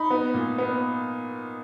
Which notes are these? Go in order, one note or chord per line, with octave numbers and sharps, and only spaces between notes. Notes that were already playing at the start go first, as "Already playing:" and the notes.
Already playing: D#4 B5
B3
A#2
B3